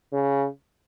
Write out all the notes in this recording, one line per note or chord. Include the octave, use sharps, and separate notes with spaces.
C#3